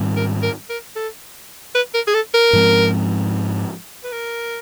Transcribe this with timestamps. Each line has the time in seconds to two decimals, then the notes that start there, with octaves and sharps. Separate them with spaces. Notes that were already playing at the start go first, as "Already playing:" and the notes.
Already playing: G#2 D#3 G3 C4
0.16 A#4
0.42 A#4
0.69 A#4
0.96 A4
1.75 B4
1.94 A#4
2.07 G#4
2.14 A4
2.34 A#4
2.53 G#2 F3 G#3 C4
4.04 B4
4.12 A#4